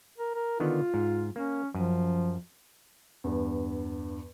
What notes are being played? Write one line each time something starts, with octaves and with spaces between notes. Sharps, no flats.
A#4
A#4
D3 D#3 B3 F4
G#2
A#3 C#4
F#2 F3
E2 G2